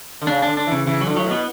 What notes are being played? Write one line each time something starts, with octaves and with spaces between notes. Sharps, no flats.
D3
C#3 D4
D3 D4
D4
C#3 E3
C#3 E3
F#3
D3
A2 F#3
B2 B3